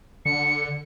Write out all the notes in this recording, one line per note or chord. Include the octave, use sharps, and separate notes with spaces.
D3 C#7